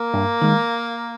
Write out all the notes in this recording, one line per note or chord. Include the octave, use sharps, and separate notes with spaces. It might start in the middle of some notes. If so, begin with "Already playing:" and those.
Already playing: A#3
G2
D#3 G#3